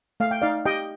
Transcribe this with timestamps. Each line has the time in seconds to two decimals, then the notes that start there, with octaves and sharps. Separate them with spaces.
0.20 A3 F5
0.31 G5
0.42 D#4 D5 F5
0.65 G4 D#5 G5